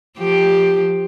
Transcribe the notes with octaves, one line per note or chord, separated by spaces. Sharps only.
F3 G4